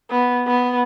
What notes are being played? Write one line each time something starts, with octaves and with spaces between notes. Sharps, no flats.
B3
B3